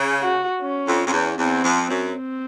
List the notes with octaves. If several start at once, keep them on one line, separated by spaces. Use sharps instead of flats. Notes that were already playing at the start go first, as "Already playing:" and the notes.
Already playing: C#3
F#4
C#4
F2
F2
E2
E2 C4
F2
F#2
C4